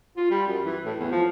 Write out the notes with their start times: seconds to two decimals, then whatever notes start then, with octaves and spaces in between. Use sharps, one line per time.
0.17 F4
0.31 G3
0.47 F#2
0.64 E3
0.85 A2
0.99 E2
1.11 F3